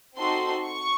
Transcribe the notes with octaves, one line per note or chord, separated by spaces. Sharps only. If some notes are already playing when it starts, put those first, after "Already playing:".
C4 D#4 F#4 A4 C6
C#6